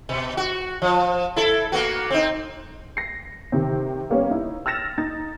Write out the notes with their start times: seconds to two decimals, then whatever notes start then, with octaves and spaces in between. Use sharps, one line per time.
0.09 B2
0.37 F#4
0.82 F3
1.36 E4 A4
1.72 A#3 B3 F#4
2.10 C4 D#4
2.97 A#6 C7
3.52 C3 D#3 C4
4.10 G3 A#3 B3 C#4
4.31 D#4 E4
4.66 E6 F6 A6 A#6 E7
4.98 D#4 A6